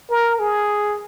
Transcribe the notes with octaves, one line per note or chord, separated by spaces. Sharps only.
A#4
G#4